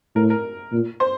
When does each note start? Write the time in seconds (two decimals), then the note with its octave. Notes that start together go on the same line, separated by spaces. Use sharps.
0.15 A2 A#4
0.30 A#4
0.73 A#2
1.00 C5